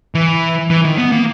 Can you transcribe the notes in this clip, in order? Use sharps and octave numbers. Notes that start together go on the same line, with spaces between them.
E3
E3
D#3
B3
A#3